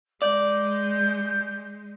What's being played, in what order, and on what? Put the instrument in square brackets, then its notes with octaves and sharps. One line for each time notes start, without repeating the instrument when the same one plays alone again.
[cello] G#3 [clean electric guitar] D5 [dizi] G6